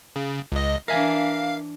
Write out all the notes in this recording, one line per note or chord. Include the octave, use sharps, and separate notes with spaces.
C#3
C#2 D#5
E3 D4 A#4 E5 F5 G#5